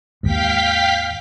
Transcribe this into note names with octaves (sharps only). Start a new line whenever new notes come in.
D#2 G#2 F5 G5 B6